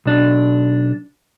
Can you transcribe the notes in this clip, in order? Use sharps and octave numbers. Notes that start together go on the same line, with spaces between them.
B1 D4